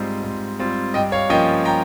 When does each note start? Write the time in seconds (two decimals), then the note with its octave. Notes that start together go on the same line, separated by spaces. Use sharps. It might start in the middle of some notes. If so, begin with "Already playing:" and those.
Already playing: G#2 G3 C4 F4 D#5
0.24 G#2
0.59 G3 C4 F4
0.94 G2 D#5 G5
1.12 C#5 F5
1.30 F3 A#3 C#4 F4 D#5 G5
1.65 G5 A#5